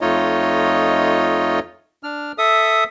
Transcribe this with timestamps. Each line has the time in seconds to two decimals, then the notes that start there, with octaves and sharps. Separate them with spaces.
0.01 F2 A3 D#4 F4 C#5 D#5
2.03 D4 F6
2.38 A4 E5 D#6